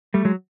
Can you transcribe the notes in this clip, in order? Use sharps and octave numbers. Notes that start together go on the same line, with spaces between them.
G3 A3
F#3 G#3